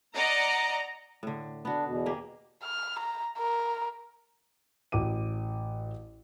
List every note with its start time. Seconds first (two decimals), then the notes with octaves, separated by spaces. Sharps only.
0.15 D5 D#5 F#5 A#5
1.23 A2 D3
1.65 B3 D4 F#4
1.85 E2 B2
2.06 A#3 G4 G#4
2.63 F6
2.99 A#5
3.38 A#4
4.92 A1 F#4 D6 D#7